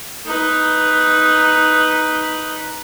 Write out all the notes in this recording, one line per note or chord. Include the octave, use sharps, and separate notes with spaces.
D#4 B4